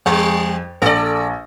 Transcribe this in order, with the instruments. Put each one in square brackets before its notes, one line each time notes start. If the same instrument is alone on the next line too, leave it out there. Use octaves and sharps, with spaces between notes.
[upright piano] F2 [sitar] G3
[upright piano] A#1 A#6 [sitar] A4 D5